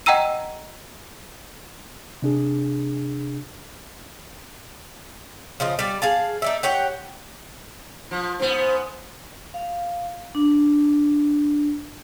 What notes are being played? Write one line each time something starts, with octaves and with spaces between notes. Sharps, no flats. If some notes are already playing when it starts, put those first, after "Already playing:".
D#5 F#5 G5 A#5 E6 D#7
C3 D4 G#4
C#3 F3 D#5
G3 D5
G#4 F5 A5
D#4 D5 E5
G4 C#5 F#5 G5
F3
G#2 B3 C5
F5
D4